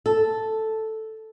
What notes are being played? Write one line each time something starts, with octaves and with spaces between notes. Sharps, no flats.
A4